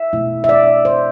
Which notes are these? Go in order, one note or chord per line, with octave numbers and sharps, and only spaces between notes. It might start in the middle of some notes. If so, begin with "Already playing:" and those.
Already playing: E5
B2 A3 E4
E5
D5
C5